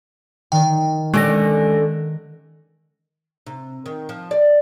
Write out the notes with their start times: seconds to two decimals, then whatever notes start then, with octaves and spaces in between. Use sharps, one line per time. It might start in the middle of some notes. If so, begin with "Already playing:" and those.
0.52 D#3 G5
1.14 D3 G#3 C#4 G4 A#6
3.46 C3
3.86 D#3
4.09 F3
4.31 D5